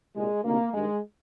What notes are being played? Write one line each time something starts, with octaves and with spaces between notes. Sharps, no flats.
C2 A#2 G#3
D2 C3 D#3 A#3
G2 D#3 G#3